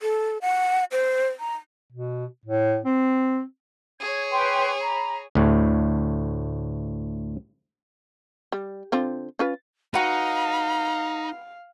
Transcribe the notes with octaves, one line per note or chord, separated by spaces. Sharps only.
A4
F#5
C5
A#5
B2
A2
C4
G#4 C#5 G#6
B4 G5 C6
A#5 B5
D2 A2
G3
D3 C4 F4
C#4 F4 B4
D#4 F#4 B4 F5 A#5